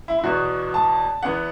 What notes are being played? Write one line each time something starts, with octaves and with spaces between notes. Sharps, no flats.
E4
E4
E2 B2 B3 F#4
A5
E2 E3 B3 F#5